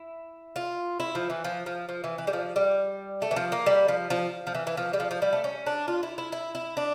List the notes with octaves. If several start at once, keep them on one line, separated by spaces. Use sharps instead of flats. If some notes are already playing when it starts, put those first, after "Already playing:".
Already playing: E4
F4
E4
F3
E3
F3
F3
F3
E3
E3
G3
F3
G3
A3
E3
F3
A#3
G3
F3
F3
F3
E3
E3
F3
G3
F3
F3
G3
A3
C#4
D4
F4
E4
E4
E4
E4
D4